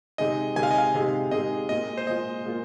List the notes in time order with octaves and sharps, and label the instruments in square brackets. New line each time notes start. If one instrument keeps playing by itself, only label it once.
[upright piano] C3 G#3 D#4 G#4 [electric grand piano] D#5
[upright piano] C3 G#3 D#4 G#4 [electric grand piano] G#5
[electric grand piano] F5
D#5
F5
[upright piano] C3 G#3 D#4 G#4
[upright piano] C3 G#3 D#4 G#4 [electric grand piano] D#5
[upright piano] A#2 G#3 F4 [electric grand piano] D#5
[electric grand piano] C5
[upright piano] A#2 G#3 F4 [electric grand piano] D#5
[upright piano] A#2 G#3 F4